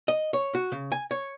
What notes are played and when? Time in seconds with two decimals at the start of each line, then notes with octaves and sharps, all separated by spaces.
0.08 D#5
0.33 C#5
0.55 F#4
0.72 C#3
0.92 G#5
1.11 C#5